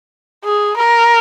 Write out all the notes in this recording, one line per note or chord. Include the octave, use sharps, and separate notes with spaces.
G#4
A#4